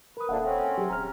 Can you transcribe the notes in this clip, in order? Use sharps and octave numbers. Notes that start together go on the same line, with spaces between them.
A#4 B4 D#6
D#1 F3 A#3 D4 A4 E5 F#5
C4 C#4
F#3 G4 G#4
D#1 A#5 F6